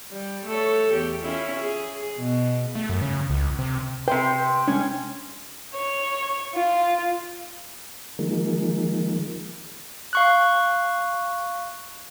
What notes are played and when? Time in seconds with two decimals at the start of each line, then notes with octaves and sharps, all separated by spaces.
0.10 G3
0.46 A3 A4 C#5
0.91 E2 G4
1.21 C#4 E4 F4
1.59 G#4
2.17 B2
2.75 A3
2.89 F#2
3.01 C#3
3.30 C#2
3.59 C3
4.08 C3 B4 C5 E5 G5
4.68 C2 G#3 C#4 D4
5.74 C#5
6.55 F4
8.19 D#3 F3 G#3 A#3
10.13 F5 C#6 F#6